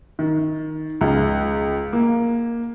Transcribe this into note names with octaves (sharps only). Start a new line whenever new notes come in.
D#3
C#2
A#3